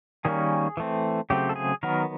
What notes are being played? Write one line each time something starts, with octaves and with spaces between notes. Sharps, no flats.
D#3 G3 A#3 C#4 G#4
E3 A3 C4
C#3 F#3 A3 C4 G4
A4
G#4
D#3 F#3 B3 A#4